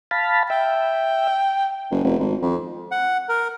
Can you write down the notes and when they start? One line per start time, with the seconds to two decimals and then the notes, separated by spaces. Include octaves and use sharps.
0.11 F5 A5 B5
0.50 E5 G5
1.91 F#1
2.04 F1
2.19 G#1
2.42 F2
2.92 F#5
3.29 A#4